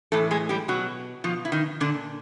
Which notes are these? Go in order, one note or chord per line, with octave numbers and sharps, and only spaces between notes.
A2 E3 A3 A4
G#3 G#4
G3 G4
B2 F#3 F#4
B2 F3 F4
E4
D#3 D#4
A#2 D3 D4